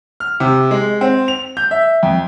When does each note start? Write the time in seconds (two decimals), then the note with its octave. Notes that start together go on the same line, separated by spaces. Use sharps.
0.20 F6
0.40 C3
0.71 G#3
1.01 C4
1.28 F7
1.57 G6
1.71 E5
2.03 F2